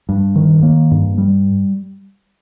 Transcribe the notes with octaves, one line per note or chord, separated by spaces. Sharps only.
G2
D#3
A#3
G2
G3